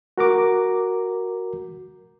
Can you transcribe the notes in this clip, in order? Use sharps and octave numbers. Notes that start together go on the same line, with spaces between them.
F#4 A#4 A#5 D6